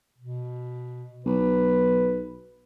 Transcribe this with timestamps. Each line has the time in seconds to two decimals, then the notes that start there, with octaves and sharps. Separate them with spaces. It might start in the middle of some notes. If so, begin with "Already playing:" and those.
0.18 B2
1.26 B1 B4